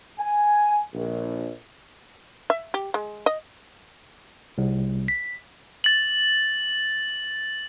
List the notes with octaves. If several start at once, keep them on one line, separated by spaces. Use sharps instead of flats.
G#5
A#1
E5
G4
G#3
D#5
C2
B6
A6 F#7